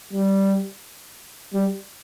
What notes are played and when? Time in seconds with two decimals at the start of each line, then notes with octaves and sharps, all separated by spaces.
0.13 G3
1.54 G3